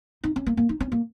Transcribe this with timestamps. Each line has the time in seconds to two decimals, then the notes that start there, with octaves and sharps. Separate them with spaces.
0.24 D#4
0.36 C#4
0.46 A#3
0.57 A#3
0.69 D#4
0.80 C#4
0.92 A#3